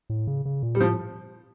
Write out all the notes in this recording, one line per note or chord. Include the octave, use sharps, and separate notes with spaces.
A2
C#3
C#3
A#2
G3
A2 F3